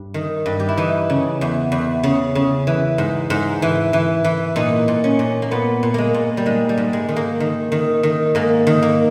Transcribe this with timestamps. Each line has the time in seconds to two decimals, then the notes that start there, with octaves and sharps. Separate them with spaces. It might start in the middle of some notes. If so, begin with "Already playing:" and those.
Already playing: G2
0.14 D#3
0.46 G2
0.60 G4
0.69 E4
0.77 E3 D#4
1.10 C#3
1.41 E2
1.72 E2
2.03 C#3
2.35 C#3
2.67 E3
2.98 G#2
3.30 G#2
3.62 E3
3.93 E3
4.24 E3
4.56 A#2 D#4
4.88 A#2
5.04 C#4
5.19 A#2
5.42 A#3
5.51 A#2 B3
5.83 A#2
5.94 G#3 A#3
6.14 A#2
6.37 G3
6.46 G#2 G#3
6.69 G3
6.77 G#2
6.93 G#3
7.09 D#3
7.16 A#3
7.40 D#3
7.72 D#3
8.03 D#3
8.35 G#2 A#3
8.67 D#3
8.82 A#3